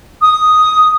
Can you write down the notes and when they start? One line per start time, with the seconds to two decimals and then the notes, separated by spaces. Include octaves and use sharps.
0.22 D#6